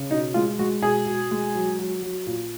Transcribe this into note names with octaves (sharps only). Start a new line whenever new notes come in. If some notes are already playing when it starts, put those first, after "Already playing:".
Already playing: C#3
B2 D#4
G#3 F4
G#3 F#4
B2 G#4
B2
G#3
F#3
F#3
F#3
A#2